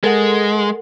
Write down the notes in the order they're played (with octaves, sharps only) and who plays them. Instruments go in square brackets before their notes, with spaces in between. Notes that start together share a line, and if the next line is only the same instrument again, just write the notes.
[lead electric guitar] G#3 [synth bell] A4 A#4 F#5